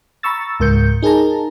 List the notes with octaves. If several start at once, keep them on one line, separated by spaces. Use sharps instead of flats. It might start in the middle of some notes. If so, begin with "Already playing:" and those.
A#5 B5 C#6 E6 A6
C#2 G#2 A#4 G6 C#7
D#4 G#4 A#4 A5 A#5